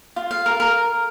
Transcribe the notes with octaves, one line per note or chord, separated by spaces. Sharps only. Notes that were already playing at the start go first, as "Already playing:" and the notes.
F4
F5
A#4
A#4